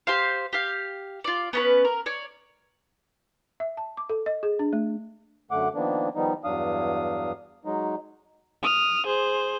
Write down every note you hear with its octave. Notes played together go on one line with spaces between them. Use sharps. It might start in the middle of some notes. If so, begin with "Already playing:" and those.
G4 C5 F5
G4 F5
F4 D5
B3 C#4 B4
A#4
C#5 D5
E5
A5
D6
A4
D#5
G#4
D4
A3
F#2 D3 A3 F#5 D6
D#3 F3 A#3 B3 D4
D#3 F3 G3 B3 D#4
E2 G2 F#3 D4 F5 D#6
F#3 G#3 D#4
D#6 F6
G#4 C5